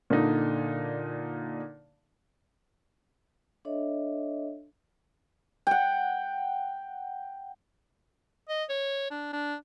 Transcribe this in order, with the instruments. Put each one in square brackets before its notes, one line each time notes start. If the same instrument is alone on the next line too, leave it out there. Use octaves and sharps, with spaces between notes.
[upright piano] A#2 D3 D4 D#4
[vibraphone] D4 A4 C#5 D#5 E5
[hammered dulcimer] F#5 G5
[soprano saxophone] D#5
C#5
D4
D4